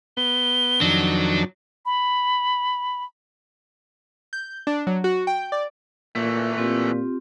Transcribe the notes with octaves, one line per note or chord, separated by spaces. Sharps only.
B3 G7
F2 D#3 F#3 D4
B5
G6
D4
F#3
F#4
G5
D5
A#2 E3 A3
A#2 C4 F4 G4